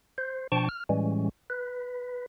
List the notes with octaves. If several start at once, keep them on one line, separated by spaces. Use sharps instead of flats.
C5
B2 F3 D4 G5 A5 C#6
F6
A2 E3 G3 G#3 C#4
B4